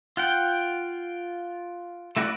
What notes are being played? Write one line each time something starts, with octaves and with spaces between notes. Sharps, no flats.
F4 F#5 G5
A3 E4 F#4 B4 D5